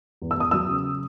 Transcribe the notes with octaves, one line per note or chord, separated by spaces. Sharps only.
E2
E6
E2 D#6
F#3 E6
C#3